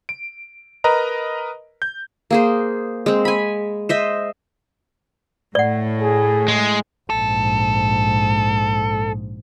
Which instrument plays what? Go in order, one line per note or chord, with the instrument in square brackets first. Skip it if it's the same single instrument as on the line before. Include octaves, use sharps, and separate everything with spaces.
[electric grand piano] D7
A#4 B4 D#5 A#5
G6
[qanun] A#3 G#4 C5
G#3 C4
G#5 B5
C5 D#5 E5
[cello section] A2 [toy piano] D5 F#5
[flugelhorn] G#4
[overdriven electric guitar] G#3
[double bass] A#1 G#2 [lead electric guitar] A4